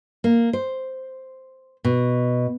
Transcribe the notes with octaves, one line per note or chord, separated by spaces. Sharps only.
A#3
C5
B2